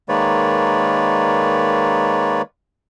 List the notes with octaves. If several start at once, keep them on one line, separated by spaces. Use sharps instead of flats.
D#3 G#3 A#3 B4 C#5 D5